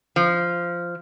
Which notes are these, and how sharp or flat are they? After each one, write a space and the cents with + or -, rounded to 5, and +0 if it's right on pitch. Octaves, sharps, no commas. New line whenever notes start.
F3 -10